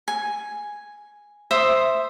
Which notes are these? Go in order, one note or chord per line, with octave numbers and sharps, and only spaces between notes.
G#5
C5 E5 D#6